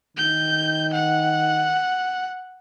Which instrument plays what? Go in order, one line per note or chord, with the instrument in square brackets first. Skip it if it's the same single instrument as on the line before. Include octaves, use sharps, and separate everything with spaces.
[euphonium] D#3 [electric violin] G6
[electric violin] F#5